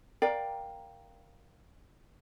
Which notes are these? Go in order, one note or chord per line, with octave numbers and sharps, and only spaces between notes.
A#4 D5 F5 G5